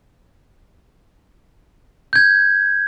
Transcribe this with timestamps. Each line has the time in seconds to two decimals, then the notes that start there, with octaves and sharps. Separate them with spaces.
2.13 G6 G#6